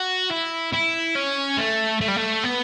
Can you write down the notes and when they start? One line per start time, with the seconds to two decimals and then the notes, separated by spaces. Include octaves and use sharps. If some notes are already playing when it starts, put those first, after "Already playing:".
Already playing: F#4
0.30 E4
0.73 E4
1.15 C#4
1.58 A3
2.01 A3
2.08 G3
2.16 A3
2.43 B3